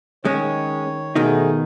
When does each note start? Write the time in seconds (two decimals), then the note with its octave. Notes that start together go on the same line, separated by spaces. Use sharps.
0.25 D#3 G#3 C#4 C#5
1.16 B2 D#3 A3 B3 D#4 G#4